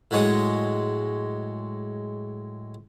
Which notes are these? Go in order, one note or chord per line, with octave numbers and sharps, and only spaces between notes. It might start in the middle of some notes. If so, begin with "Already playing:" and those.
A2 F#3 G#3 C#5 D#6